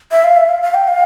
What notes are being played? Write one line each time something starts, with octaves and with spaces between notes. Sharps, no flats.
E5
F5
E5
F5
F5
G5
F5